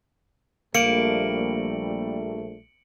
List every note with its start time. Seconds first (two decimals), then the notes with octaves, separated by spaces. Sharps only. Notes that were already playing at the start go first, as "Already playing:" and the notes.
0.75 A#1 G3 A3 A#3 C#7 D7 F#7